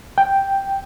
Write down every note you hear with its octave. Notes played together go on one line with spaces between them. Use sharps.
G5